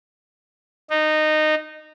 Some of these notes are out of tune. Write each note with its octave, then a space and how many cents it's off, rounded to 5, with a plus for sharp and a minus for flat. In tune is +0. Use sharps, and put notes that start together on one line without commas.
D#4 -15